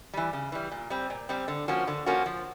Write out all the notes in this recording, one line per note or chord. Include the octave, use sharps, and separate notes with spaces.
E3 G3
C#3
E3 G3
A#2
G3 C4
A#2
G3 C4
D3
F3 A#3 C#4 F#4
D3
F3 A#3 C#4 F#4
F3